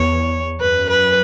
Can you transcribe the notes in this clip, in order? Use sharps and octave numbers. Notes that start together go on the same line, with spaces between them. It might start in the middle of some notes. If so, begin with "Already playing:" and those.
Already playing: E2 C#5
F#2 B4
B4